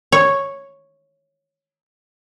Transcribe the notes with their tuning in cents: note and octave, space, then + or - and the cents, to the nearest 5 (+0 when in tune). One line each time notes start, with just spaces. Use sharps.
C#5 -5